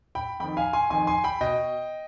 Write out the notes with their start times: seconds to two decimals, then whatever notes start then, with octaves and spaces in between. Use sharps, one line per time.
0.15 G5 B5
0.40 F2 D#3 G5 B5
0.57 F5 G#5
0.73 G#5 C6
0.90 F2 D#3 G#5 C6
1.07 G#5 C6
1.24 G5 B5
1.41 B2 D#5 G5